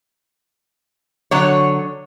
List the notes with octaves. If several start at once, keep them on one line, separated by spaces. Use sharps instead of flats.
D3 F#3 C#5